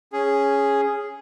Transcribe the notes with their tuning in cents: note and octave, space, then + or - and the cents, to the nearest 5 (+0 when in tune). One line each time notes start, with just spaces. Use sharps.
C#4 +0 G#4 +0